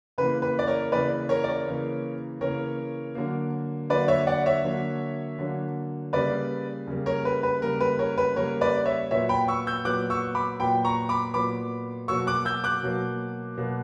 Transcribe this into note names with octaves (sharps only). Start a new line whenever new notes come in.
C#3 E3 A#3 B4
B4
D5
A#4 C#5
C#3 E3 A#3 B4 D5
A#4 C#5
D5
A#4 C#5
C#3 E3 A#3
C#3 E3 A#3 A#4 C#5
D3 F#3 A#3
D3 F#3 A#3 B4 D5
C#5 E5
D5 F#5
C#5 E5
D3 F#3 A#3
D3 F#3 A#3
C#3 G3 A#3 B4 D5
C#3 G3 A#3
A#4 C#5
B4
B4
C#3 G3 A#3 A#4
B4
A#4 C#5
B4
C#3 G3 A#3 A#4 C#5
B4 D5
C#5 E5
A#2 F#3 B3 C#5 E5
G5 B5
C#6 E6
E6 G6
A#2 F#3 B3 D6 F#6
C#6 E6
B5 D6
A#2 F#3 B3 G5 B5
A#5 C#6
B5 D6
A#2 F#3 B3 B5 D6
B2 F#3 A#3 C#6 E6
D6 F#6
E6 G6
D6 F#6
B2 F#3 A#3
B2 F#3 A#3